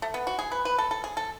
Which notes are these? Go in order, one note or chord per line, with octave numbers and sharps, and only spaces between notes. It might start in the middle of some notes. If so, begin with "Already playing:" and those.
A3
B3
F#4
G#4
B4
B4
A4
A4
G#4
A4